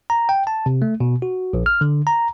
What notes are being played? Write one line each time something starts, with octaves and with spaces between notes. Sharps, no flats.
A#5
G5
A5
C3
A3
B2
F#4
A#1
F6
D3
A#5